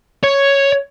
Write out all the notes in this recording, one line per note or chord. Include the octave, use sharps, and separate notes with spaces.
C#5